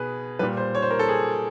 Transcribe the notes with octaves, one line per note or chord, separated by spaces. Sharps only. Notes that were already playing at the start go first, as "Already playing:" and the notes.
Already playing: B2 G#4 B4
A#2 G3 B4
C5
C#5
C5
A#4
A4
G#4